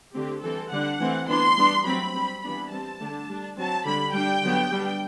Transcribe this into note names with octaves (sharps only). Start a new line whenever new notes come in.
D3 A3 C4 G4
E3 G3 C4 A4
D3 G3 D4 F#5
E3 A3 C4
E3 B3 D4 C6
G3 B3 D4
F#3 A3 C4 B5
G3 C4
E3 G3 B3 D4 B5
G3 C4 A5
D3 A3 D4
G3 D4
F#3 C4 A5
D3 G3 D4 B5
G3 D4 G5
D3 F#3 B3
G3 B3 D4